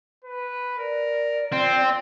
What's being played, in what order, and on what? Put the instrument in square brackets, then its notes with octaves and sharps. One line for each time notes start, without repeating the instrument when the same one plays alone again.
[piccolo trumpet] B4
[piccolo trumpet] A#4 [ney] D5
[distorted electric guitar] C4 [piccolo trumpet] F4